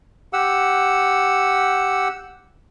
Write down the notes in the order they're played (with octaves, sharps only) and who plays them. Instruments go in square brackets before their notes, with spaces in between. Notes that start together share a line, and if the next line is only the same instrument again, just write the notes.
[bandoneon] G4 F#5 E6